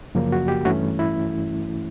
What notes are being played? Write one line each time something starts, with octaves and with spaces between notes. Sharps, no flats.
F#2 C#3 F3 A#3
F#4
G4
G2 E3 A3 C#4 F#4
E4